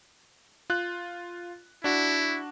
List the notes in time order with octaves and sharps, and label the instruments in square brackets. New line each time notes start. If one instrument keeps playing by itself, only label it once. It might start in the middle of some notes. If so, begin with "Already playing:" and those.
[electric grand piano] F4 F#6
[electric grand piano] D4 F#4 [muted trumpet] E4